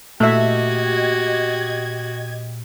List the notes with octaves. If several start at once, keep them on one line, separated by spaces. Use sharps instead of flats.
A#2 A3 F#4 G4 D#5 E5 G#6